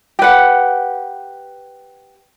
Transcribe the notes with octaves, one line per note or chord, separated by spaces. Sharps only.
G4 B4 F#5